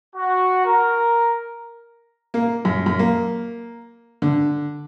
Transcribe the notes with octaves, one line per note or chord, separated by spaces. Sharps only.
F#4
A#4
A#3
F#2
F#2
A#3
D3